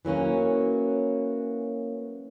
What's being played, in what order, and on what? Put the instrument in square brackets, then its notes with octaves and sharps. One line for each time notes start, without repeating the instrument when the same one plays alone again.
[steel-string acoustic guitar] E3 F#3 A#3 C#4